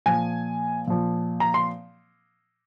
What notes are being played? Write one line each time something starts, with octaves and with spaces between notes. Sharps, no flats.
A#2 F3 G#5
A#2 F3
A#5
C6